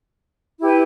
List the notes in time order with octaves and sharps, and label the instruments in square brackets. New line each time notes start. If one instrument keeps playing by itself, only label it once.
[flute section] E4 G4 B4